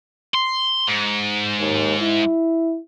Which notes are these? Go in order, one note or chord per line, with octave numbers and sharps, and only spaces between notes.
C6
G#2
D#2
E4